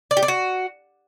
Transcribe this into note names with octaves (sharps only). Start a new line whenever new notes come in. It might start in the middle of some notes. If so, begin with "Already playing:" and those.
D5
G4
D5
F#4